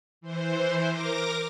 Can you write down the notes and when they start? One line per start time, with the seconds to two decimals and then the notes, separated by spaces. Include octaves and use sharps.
0.21 E3 C5
0.89 A#4 D6 A#6